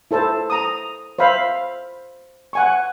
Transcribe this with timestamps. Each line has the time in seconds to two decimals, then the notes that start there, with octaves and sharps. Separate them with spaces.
0.11 E4 A4 C5 A5
0.50 A#5 D#6
1.19 C5 E5 F5 B5
2.53 F#5 G#5 C#6